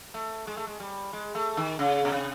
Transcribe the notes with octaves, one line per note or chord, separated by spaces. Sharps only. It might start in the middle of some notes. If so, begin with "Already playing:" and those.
A3
G#3
A3
G#3
G3
G#3
A3
D#3
C#3
B2
C3